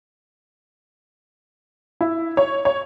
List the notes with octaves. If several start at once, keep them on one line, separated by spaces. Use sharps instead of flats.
E4
C#5
C#5